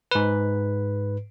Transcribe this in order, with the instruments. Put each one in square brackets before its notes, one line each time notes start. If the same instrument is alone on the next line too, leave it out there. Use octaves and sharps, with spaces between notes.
[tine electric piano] G#2 B4